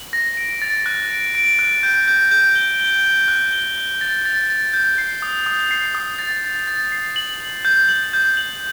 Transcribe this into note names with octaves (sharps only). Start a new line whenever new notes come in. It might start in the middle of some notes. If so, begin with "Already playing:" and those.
Already playing: F#7
A#6
D7
A6
F#6
D7
D7
F#6
G6
G6
G6
G7
G7
G7
F#6
G7
G7
A6
A6
A6
G6
C7
D#6
D#6
C7
D#6
A6
A6
A6
C7
F#7
F#7
G6
F#7
G6
F#7